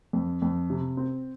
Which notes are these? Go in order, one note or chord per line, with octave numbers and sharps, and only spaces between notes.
F2
F2
C3
C4